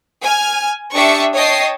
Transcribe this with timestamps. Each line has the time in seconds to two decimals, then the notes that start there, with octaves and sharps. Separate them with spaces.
0.22 G#5 F6
0.94 D4 G4 E5 C#6 D#6 C#7
1.35 C#5 D#5 G5 A5 D#6 C7